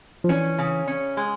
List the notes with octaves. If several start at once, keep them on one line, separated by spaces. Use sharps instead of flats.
F3
E3 C#4
C#3
C#4
G#3